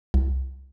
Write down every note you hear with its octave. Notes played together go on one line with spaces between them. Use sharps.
C2